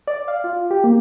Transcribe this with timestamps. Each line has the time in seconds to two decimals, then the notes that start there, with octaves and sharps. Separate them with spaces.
0.07 D5
0.28 F5
0.44 F4
0.71 G4
0.84 A#3